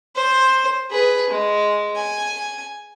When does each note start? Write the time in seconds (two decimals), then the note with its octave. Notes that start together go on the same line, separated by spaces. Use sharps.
0.16 C5
0.91 G#4 B4
1.30 G#3
1.96 G#5